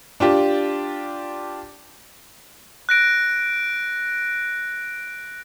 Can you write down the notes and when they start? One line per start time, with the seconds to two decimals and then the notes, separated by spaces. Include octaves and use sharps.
0.20 D4 F4 G4
2.89 F#6 A#6 D7